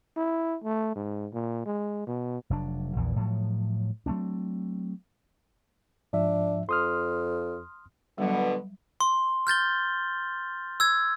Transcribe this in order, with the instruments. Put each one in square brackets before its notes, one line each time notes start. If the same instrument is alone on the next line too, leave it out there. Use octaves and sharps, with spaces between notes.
[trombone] E4
A3
G#2
A#2
G#3
B2
[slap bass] F1 F#3 D4
A#1 E2 E3
A2 F3 F#3
F#3 A3 C4 D4
[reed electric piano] G#2 F3 E5 [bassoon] D4
[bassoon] F2 [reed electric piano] C6 D#6 F6
[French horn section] B2 D3 B3 [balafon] F#3 G3
[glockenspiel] C6
F6 G6 A6 G7
E6 G#6